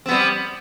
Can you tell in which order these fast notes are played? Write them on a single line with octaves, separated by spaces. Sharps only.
C4 B3 G3